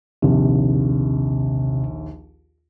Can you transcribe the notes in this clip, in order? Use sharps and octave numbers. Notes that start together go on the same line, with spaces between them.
A#1 D#2 C3